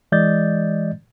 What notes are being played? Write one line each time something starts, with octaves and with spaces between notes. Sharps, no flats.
E3 G#3 D5 D#5 G6 A6